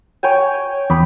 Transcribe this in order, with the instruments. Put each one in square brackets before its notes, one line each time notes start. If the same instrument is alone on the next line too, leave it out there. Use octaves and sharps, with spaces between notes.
[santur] C#5 G5 G#5
[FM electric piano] E2 [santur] B5